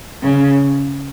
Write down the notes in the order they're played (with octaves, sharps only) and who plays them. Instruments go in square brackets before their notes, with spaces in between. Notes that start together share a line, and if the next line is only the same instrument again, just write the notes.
[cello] C#3